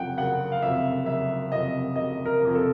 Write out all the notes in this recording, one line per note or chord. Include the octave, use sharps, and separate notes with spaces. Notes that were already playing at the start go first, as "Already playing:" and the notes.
Already playing: F#1 F2 C3 F#5 G5
F#1 F#5
F5
F2 C3 E5
F#1 E5
F2 C3 D#5
F#1 D#5
A#4
F2 C3
A4